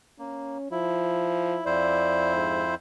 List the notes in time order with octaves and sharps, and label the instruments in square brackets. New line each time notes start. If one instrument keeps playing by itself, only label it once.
[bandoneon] A#3 [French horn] C#4
[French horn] F3 [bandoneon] E4
[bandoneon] F2 E4 C5 [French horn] D5
[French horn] G#2